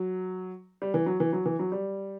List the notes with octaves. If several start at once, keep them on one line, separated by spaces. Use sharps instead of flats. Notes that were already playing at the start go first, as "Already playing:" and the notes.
Already playing: F#3
G3
E3
F#3
E3
F#3
E3
F#3
G3